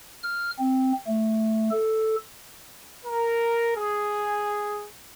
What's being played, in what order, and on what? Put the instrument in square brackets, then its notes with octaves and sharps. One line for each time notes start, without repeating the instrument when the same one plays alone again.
[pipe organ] F6
C4
A3
A4
[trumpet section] A#4
G#4